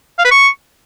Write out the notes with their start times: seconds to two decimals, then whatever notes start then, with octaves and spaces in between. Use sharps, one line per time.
0.19 F5
0.25 B4
0.31 C#6